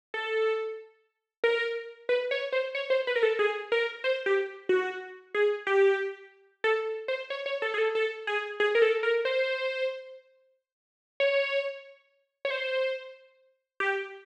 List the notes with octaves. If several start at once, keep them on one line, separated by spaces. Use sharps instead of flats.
A4
A#4
B4
C#5
C5
C#5
C5
B4
A#4
A4
G#4
A#4
C5
G4
F#4
G#4
G4
A4
C5
C#5
C#5
A4
G#4
A4
A4
G#4
G#4
A#4
A4
A#4
C5
C#5
C#5
C5
G4